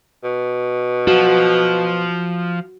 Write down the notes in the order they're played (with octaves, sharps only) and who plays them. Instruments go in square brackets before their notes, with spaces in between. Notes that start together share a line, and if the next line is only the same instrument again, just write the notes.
[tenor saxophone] B2
[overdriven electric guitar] F3 [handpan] F#4